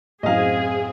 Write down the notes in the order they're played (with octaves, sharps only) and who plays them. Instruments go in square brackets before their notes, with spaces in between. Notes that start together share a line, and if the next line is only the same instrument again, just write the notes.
[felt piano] F#2 A2 [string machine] C4 [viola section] G#4 [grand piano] D#5 F5